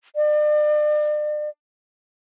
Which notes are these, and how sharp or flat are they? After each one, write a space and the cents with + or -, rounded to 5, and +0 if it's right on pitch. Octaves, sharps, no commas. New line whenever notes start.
D5 +40